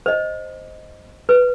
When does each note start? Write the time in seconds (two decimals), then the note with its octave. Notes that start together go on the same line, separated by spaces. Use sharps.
0.06 C5 D#5
1.29 B4